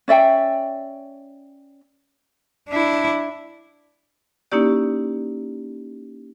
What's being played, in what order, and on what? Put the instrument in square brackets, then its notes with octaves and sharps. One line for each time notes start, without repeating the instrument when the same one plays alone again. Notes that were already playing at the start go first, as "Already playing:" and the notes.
[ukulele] C#4 D5 E5 G5
[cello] D4 E4
[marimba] A#3 C#4 D#4 E4 G4 D5